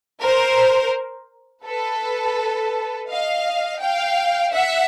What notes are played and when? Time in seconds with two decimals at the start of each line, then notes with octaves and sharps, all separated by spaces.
0.23 A#4 C5
1.66 A4 B4
3.09 D#5 F5
3.81 F5 G5
4.53 E5 F#5